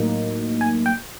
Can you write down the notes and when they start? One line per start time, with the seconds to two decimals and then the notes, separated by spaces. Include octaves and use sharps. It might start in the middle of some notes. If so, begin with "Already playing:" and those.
Already playing: A2 F#3 A#3 D#4
0.61 G#5
0.86 G5